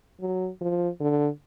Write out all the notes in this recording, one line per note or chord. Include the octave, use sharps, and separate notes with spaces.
F#3
F3
D3